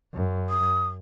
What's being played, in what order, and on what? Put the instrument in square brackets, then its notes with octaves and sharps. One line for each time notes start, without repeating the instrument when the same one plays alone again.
[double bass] F#2
[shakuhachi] D#6